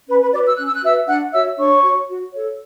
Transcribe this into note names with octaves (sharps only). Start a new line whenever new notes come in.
C#4 B4 B5
B4 B5
F#4 B4 D5 D6
E6
C#4 F#6
E6
F#6
F#4 B4 E5 E6
D4 F#5 F#6
F#4 C#5 E5 E6
D4 C#5 C#6
F#4 C#5
F#4
A4 C#5